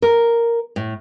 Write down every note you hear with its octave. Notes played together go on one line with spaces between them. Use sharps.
A#4
A2